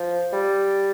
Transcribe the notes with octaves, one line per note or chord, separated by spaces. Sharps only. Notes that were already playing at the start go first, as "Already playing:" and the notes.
Already playing: F3
G3